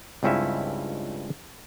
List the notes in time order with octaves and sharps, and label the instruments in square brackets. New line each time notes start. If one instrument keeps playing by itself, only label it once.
[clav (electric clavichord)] C#2 G2 C4 C#4 E4 E5